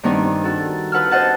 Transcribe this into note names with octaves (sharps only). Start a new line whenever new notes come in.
G2 D#3 B3 C4 D4 D#4
F#4 A4
F4 B4 F#5 A5 E6 F6
C5 D#5 F#5 A5